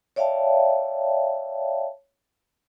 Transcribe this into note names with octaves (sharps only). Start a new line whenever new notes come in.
C#5 D5 E5 F5 G5 A5